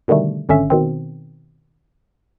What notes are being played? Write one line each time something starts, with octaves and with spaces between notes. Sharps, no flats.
B2 D3 D#3 G3 A3
G#1 D3 C#4 E5
B2 D#3 C4